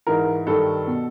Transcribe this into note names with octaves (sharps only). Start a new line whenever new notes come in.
G#2 E3 A#4
G2 D#3 A4
B2